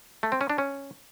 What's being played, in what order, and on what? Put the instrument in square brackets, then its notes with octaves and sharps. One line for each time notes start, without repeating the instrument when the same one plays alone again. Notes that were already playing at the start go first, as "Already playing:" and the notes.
[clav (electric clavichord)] A3
C4
C#4
D4
C#4